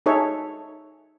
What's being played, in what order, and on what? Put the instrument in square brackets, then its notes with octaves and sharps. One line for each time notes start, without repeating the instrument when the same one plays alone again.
[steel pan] D#4 G#4 A4 C#5 E5